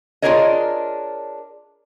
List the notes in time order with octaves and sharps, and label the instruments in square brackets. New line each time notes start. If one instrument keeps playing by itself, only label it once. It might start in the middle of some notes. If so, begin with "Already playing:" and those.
[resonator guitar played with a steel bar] D4 F4 G#4 A#4 C#5 D#5